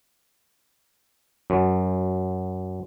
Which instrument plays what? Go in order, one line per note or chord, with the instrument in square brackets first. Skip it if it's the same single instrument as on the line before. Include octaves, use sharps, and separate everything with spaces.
[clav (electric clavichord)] F#2